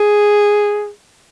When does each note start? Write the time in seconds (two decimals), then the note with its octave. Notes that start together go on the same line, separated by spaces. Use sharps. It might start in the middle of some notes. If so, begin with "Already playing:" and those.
Already playing: G#4